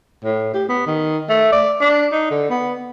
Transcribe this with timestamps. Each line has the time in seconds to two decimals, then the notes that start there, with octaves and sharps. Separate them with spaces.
0.24 A2
0.54 G4
0.69 B3
0.86 D#3
1.29 A3
1.52 D5
1.81 D4
2.12 D#4
2.31 D3
2.50 B3